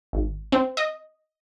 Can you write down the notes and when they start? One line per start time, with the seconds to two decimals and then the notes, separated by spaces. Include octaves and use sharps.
0.13 G#1
0.52 C4
0.77 D#5